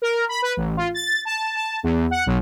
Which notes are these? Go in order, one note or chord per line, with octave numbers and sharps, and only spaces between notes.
A#4
B5
B4
A1
F4
A6
A5
A5
E2
F#5
B1